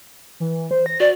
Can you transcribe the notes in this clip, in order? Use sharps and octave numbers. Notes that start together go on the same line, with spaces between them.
E3
C5
A#6
F#4 D5